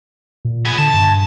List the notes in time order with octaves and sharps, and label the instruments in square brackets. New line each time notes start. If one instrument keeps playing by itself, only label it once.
[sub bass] A#2
[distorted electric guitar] B3 G#4
[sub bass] D3 [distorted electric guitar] A5
[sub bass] G2